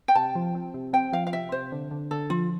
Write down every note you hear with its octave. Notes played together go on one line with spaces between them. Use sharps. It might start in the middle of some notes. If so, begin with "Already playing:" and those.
G5
C3 A5
F3
C4
C3
C4 G5
F3 F5
F5
C3 E5
C3 C5
D3
D3
D3 A4
F3 F4